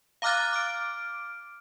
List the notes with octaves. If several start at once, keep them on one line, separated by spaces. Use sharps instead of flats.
F5 A#5 D6 F6 F#6 A6
D6 F6 D7